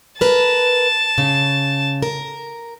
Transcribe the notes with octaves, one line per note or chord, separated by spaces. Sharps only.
A#4 B4 A5
C#3
A#4